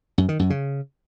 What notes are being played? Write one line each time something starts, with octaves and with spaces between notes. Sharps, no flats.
F#2
D#3
F#2
C#3